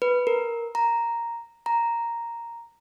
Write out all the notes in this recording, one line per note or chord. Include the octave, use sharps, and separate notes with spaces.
B4
A#4
A#5
A#5